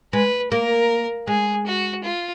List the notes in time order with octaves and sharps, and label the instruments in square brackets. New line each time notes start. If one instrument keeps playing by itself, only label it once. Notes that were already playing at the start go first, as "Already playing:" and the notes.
[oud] G#3 [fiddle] B4
[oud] A#3 [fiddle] A#4
[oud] G#3 [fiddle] G#4
[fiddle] F#4
F4